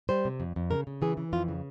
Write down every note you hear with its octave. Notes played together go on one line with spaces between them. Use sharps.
G3 C5
C3
F2
F2
C#3 A#4
C#3
E3 G#4
E3
F2 F4
C#3